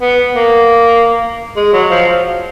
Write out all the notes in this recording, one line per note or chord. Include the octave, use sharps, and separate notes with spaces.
B3
A#3
G#3
F#3
F3